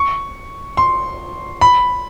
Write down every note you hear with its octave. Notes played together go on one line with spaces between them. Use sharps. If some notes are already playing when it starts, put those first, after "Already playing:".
Already playing: C#6
C6
B5